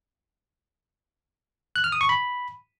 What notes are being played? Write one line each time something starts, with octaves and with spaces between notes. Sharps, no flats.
F#6
F6
D#6
C#6
B5